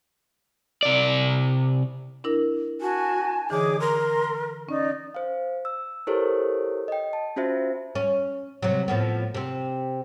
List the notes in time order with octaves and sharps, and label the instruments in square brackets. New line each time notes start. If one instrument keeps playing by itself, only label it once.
[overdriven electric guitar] C3 D5
[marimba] D4 E4 A#4
[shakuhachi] F#4 [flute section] G#5 A5
[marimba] D3 E3 [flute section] D#4 C#5 D6 [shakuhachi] G#4
[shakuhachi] A#4 [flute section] A#5 C6
[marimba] C#4 [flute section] D#4 D5
[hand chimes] C5 F5
E6
E4 G4 A4 A#4 C5 C#5
D#5 G5
A5
C#4 F4 F#4 C5 E5
[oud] C#4
C3 F#3
A2 F3 B3
C3 C4